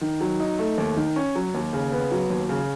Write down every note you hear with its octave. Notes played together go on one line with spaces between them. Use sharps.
D#3
F#3
D#4
A3
D#2
D#3
C#4
F#3
D#2
C#3
B3
F#3
D#2
C#3